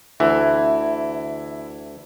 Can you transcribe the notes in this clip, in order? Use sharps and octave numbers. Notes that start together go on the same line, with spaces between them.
D2 E3 E4 E5